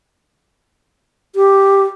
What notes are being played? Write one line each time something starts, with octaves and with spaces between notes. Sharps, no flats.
G4